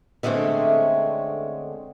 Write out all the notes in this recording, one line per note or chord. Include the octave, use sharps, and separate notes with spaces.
D3 G#3 A3 C4 C#4